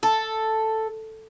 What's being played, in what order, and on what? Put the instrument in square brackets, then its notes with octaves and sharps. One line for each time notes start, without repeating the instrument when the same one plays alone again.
[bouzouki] A4